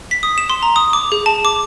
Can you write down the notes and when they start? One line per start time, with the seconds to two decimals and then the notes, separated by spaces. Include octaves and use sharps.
0.11 B6
0.23 D#6
0.38 E7
0.50 C6
0.63 A#5
0.76 D#6
0.93 D6
1.12 G#4
1.26 A5
1.45 D6